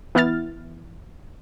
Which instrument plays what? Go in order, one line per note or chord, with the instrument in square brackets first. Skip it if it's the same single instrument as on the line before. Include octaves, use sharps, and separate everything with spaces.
[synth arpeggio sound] E3 B3 E4 F6 A6